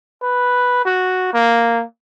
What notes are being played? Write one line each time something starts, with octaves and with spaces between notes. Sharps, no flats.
B4
F#4
A#3